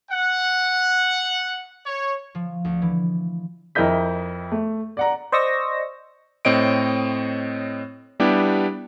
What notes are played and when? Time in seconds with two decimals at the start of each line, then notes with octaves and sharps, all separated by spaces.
0.11 F#5
1.86 C#5
2.35 F3
2.65 D2
2.82 E3
3.75 F2 E4 A#4 D#5 G6 B6
4.52 A3
4.97 D5 F#5 A#5
5.32 C5 D5 D#5 C#6 E6 A#6
6.45 A2 C4 C#5 D#5 D7
8.20 G3 B3 D4 E4 G4